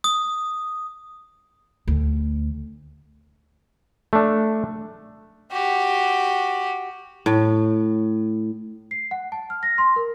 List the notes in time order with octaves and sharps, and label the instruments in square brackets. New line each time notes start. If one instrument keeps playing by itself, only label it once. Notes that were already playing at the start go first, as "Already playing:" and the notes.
[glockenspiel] D#6
[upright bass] D2
[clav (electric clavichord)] A3 D4
[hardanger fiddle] F#4 G4
[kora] A2
[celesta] C7
F#5
A5
F6
A#6
C6
A#4